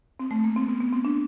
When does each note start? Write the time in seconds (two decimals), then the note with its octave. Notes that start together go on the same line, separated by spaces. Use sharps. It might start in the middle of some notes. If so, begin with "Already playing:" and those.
0.20 C4
0.31 A3
0.44 A#3
0.56 C4
0.68 B3
0.80 B3
0.92 C4
1.05 D4